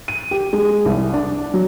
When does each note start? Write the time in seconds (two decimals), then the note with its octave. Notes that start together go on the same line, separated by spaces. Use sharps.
0.08 D#7
0.31 G4
0.53 G#3
0.86 C2
1.14 D4
1.54 F#3